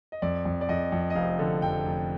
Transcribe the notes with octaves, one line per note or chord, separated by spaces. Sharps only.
D#5
F2 D5
F2
D5
F2 D#5
F2
D#5
F1 F5
D3
F1 G5
F1